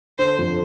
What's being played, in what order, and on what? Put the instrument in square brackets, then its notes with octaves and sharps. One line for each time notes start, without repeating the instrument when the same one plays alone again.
[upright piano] D3 [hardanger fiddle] C5
[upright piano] F2